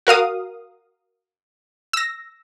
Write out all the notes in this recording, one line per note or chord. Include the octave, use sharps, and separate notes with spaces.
F#4 A#4 F5 D#6
E6 A#6